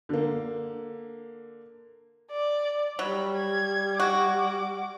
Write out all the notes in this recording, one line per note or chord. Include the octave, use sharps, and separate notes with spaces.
D3 A#3
D5
F#3 G3 B5
G#6
F#4 D6